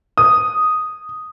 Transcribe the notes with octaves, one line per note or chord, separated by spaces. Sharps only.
D#6